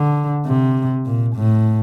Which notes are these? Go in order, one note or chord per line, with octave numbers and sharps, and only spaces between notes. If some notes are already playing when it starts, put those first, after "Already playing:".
Already playing: D3
C3
A#2
A2